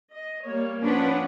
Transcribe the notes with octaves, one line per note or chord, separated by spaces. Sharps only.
D#5
G3 A#3 C#5
F3 C#4 D4 B4 F#5